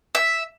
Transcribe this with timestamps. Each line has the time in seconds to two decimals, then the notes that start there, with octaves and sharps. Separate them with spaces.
0.15 E5